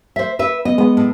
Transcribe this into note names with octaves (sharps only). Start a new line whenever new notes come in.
C5 E5
B4 E5
B3 D#5
G#3 B3 D#5
A2